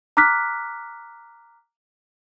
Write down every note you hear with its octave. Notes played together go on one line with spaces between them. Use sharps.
A#5 D6 F6 F#6 B6